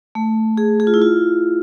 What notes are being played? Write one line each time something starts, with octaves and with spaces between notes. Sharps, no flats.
A3
G#4
G#4
F4
E4
F4